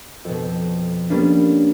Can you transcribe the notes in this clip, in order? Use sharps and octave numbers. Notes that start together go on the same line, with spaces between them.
F2 B2
G3 A#3 B3 C#4 D4